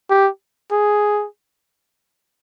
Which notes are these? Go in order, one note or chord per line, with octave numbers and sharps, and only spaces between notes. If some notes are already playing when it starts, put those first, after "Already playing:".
G4
G#4